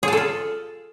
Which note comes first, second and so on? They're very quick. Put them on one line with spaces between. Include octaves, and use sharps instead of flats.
G#4 A5 A4 F4